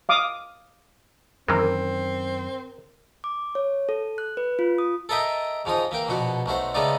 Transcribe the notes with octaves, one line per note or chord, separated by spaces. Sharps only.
F5 D6 D#6
F#2 D#3 E3 G#3 C4 A#4
D6
C#5
A4
F#6
B4
F4
D#6
A4 A#4 D#5 E5 G5
G#2 F3 D#4 D#6
E3 A#3 G5
A#1 B2 B3 F#4
B1 A3 F#4 C5
C#3 G#3 A3 B3 D#4 D5